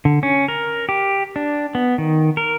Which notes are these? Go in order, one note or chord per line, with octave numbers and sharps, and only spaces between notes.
D3
C#4
A#4
G4
D4
B3
D#3
A#4